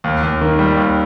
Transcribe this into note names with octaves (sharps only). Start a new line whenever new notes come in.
D#2
D#2
D#3
G3
D#2